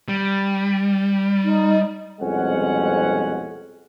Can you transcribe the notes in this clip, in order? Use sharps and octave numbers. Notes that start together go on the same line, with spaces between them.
G3
D#4
C2 F2 B2 G#3 C#4 F#5